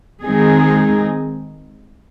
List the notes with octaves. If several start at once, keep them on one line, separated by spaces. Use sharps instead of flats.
D#3 G#3 C4 D#4 G#4